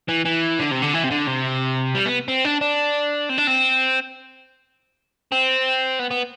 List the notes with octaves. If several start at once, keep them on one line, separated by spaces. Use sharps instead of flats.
E3
E3
D3
C3
D3
E3
C3
D3
C3
G3
B3
C4
D4
D4
C4
D4
C4
C4
B3
B3